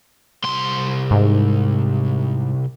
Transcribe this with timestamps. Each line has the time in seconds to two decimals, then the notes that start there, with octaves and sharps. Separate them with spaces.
0.44 C2 C6
1.11 G#2